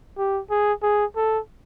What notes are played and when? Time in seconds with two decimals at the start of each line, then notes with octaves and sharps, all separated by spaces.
0.17 G4
0.50 G#4
0.82 G#4
1.16 A4